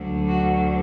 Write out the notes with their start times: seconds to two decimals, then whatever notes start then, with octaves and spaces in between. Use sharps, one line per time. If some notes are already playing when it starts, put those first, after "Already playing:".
Already playing: D2 D3 F#3
0.28 F#4